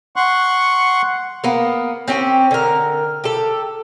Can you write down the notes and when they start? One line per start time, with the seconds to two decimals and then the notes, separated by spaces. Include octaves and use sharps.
0.16 F#5 C6 C#6 F#6
1.44 A#3 B3
2.08 C4 C#4 G4
2.51 D3 A#4
3.24 G4 A4